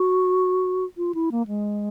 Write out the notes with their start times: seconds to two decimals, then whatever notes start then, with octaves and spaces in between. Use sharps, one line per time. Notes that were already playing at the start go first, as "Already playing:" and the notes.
Already playing: F#4
0.97 F4
1.14 E4
1.32 A#3
1.47 G#3